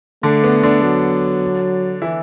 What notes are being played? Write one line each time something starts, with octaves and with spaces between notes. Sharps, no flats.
D3 A3 D4
B3
D3 D4
F#3
E3 E4